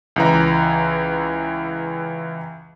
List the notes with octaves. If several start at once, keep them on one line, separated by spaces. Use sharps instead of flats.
C#2 E3 A#5